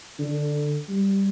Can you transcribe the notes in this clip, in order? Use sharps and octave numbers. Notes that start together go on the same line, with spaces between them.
D3
G3